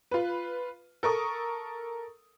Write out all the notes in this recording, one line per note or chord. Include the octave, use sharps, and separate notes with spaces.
F4 B4
A4 A#4 C#6 D#6